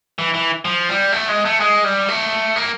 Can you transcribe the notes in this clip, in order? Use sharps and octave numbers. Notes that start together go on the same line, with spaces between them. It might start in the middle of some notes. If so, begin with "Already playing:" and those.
E3
E3
F3
G3
A3
G#3
A3
G#3
G3
A3
A#3